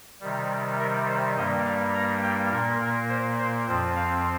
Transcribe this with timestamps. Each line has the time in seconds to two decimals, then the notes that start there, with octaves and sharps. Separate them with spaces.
0.21 C3 D#3 G3
0.79 A#4
1.08 C5
1.36 G2 G3 A#3 D#5
1.66 F5
1.95 A#5
2.23 G5
2.51 A#2 A#3 A#4
2.81 A#4
3.09 C5
3.38 C5
3.67 F2 F3 C4 C5
3.96 F5